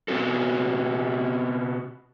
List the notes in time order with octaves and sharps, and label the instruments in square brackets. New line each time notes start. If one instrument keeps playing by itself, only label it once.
[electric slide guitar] B2 B3 C4 F#4 A4